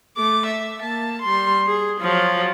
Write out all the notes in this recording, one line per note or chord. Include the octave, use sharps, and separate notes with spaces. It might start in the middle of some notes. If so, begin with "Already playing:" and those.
A3 D6
E5
A#3 A5
G3 C6
G#4
F3 F#3